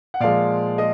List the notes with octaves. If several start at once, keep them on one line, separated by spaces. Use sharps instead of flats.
F#5
A#2 F3 G#3 D5 F5
G#3 D#5